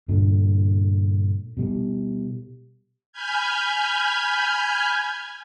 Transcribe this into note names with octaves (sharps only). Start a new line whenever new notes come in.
G2 A#2 D3
B2 G3
G#5 B5 F6 G6 G#6